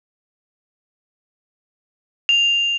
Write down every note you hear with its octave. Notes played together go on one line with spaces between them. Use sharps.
F7